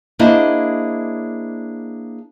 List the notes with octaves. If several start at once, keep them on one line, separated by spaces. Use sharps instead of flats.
A#3 D4 E4 G#4 C5 D#5